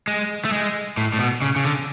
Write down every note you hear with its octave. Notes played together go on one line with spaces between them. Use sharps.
G#3
A3
G#3
A2
A2
B2
C#3
C#3
D3